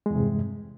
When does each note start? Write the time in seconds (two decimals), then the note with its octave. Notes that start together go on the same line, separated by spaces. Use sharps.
0.06 G#3
0.10 E2
0.15 C3
0.19 G2